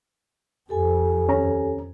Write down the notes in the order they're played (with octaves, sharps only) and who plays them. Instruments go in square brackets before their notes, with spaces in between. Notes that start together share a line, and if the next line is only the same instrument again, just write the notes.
[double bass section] F2 [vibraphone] G4 A4 G#5
[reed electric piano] D#2 C#4 A#5